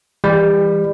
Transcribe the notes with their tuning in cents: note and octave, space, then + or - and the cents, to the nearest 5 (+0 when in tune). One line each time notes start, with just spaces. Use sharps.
E3 +0 G3 +30